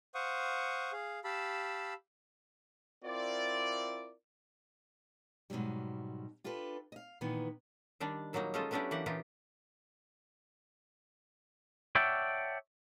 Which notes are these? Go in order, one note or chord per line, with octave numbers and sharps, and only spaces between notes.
C5 F5 F#5 C#6 D#6
G#4 F5
G4 F5 A5 B5 E6
C4 E4 F4 A#4 D5
G#2 B2 E3 F#3 G3
D4 F4 G4 A4 B4
D#5 F5
A#2 D#3 E3 B3
D#3 G3 D4
A#2 F#3 G3 A#3 D#4
G#3 C#4 D#4 F4 A4 D#5
F#3 B3 C#4 D4 E4 G4
E3 A#3 G4 F#5
A#2 E3 D#4 F4 G4
C#5 D5 E5 F#5 G5 A5